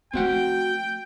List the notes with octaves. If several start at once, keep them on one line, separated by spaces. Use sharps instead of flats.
F3 A3 C4 F#4 F#5 G5